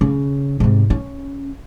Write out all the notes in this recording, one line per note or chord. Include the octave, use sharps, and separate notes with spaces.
C#3
G#2 C3
C#4